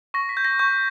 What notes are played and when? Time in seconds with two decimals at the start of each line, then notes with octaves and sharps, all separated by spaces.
0.14 C#6 A#6
0.29 B6
0.37 G6
0.45 A#6
0.59 C#6 G6